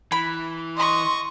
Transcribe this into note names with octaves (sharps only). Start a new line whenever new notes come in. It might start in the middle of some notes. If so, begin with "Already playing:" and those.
E3 B5
D#5 C6 C#6